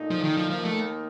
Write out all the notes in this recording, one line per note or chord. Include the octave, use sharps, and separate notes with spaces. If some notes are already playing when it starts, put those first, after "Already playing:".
Already playing: A#2 A3 D#4
F3
D#3
F3
D#2 D#3 F3 A#3
A3